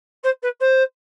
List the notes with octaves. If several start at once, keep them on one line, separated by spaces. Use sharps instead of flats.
C5
B4
C5